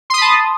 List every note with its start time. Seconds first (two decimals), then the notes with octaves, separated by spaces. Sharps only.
0.10 C6
0.14 D#6
0.18 B5
0.21 A5